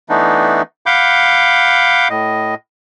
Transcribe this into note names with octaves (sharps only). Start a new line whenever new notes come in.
E3 A3 B3 D4 D#4
F5 F#5 B5 D6 G6
A2 D#5